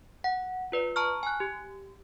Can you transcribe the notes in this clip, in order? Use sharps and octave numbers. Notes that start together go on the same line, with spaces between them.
F#5
F4 B4 D5
A5 A#5 C#6 F6
G#5 F#6
G4